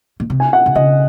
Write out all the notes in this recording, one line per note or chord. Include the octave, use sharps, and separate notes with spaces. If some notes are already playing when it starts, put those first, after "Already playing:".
A#2
C3
G#5
F#5
C3
C#3 D#5